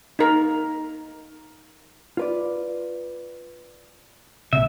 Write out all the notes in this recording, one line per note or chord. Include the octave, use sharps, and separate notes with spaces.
D#4 A#4
F4 B4 D5
A#1 C3 E5